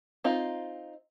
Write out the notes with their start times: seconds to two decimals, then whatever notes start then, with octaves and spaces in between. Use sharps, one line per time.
0.24 C4 D#4 F4